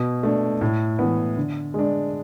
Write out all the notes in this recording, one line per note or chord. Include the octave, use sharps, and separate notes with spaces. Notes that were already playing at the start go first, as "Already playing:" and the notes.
Already playing: B2
A3 D4
A2
E3 B3
D3
G#3 D4